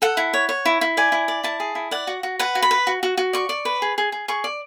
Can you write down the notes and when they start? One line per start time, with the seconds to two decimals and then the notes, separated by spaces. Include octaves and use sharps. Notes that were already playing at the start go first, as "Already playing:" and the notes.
0.02 A4 F#5
0.17 E4
0.33 C#5
0.49 C#5
0.65 E4
0.81 E4
0.97 D5 G#5
1.12 E4
1.28 D5
1.44 E4 A5
1.60 G#4
1.75 E4
1.91 D5 F#5
2.07 F#4
2.23 F#4
2.39 B4 F#5
2.55 F#4
2.62 B5
2.71 B4
2.87 F#4
3.03 F#4
3.17 F#4
3.33 D5 C#6
3.49 D5
3.65 B4
3.82 G#4
3.98 G#4
4.12 G#4
4.28 G#4 C#6
4.44 D5